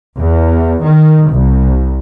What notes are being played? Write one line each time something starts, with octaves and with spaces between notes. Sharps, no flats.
E2
D#3
C2